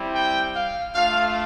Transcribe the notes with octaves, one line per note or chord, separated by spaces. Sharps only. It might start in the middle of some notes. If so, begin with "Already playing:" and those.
Already playing: G3 C4 E4 G4
G5
F5
A3 D4 F4 F5